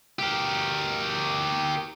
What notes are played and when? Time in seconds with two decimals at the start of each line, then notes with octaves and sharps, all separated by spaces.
0.19 G4 A#4